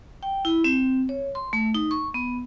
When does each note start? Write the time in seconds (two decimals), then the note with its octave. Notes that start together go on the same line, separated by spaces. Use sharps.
0.23 G5
0.45 E4
0.64 C4
1.09 C#5
1.35 C6
1.53 A3
1.74 D#4
1.91 C#6
2.14 B3